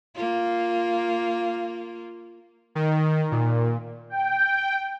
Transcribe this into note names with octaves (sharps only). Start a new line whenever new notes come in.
A#3 F4
D#3
A#2
G5